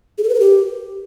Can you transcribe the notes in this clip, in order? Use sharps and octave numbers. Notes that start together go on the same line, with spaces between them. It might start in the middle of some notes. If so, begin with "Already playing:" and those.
G#4
A4
B4
A#4
G4